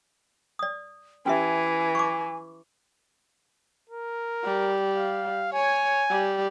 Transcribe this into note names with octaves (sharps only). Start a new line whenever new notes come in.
D5 D#6
E3 C#4 G4 E5 G#5
C#6 D6
A#4
G3
F5
C#5 G#5
G3